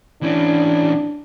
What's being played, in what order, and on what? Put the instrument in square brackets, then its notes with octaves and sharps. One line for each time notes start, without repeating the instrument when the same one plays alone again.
[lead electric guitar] E3 C#4 [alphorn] D4